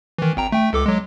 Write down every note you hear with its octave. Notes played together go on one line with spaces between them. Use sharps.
D#3 E3
G#1 G5 A#5
A3 G5
C#2 A4 D6
F#3 G#3